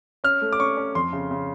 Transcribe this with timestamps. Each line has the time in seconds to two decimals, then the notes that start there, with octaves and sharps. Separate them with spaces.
0.24 C#4 F6
0.42 A3
0.52 D6
0.59 C#4 C#6
0.77 C#4
0.95 F2 C6
1.13 C#3
1.31 C#3